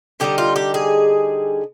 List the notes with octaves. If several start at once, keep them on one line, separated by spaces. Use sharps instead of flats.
D3 G3 C4 D#4 G4
F4
G4
G#4